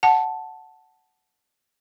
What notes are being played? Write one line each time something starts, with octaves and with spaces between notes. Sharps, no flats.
F#5 A5